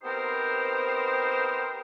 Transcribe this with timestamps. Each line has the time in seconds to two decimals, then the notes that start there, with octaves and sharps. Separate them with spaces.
0.02 B3 C4 D#4 G4 A#4 C5